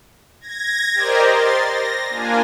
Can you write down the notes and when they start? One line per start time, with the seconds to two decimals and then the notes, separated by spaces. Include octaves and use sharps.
0.40 G#6 A#6
0.94 G4 A#4 C5 D5 D#5
1.30 C6 A6
1.68 A#6
2.09 A#3 D4 F4 G#5